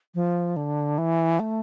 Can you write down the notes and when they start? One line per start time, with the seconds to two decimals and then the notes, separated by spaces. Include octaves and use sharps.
0.15 F3
0.56 D3
0.98 E3
1.40 A3